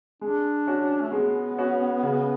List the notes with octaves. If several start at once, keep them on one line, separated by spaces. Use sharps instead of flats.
G#3 D4
C#4 F#4
A3
G#3 B3
C#4 F#4
C#3